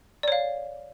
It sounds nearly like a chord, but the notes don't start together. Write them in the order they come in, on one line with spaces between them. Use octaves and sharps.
D5 C#5 F5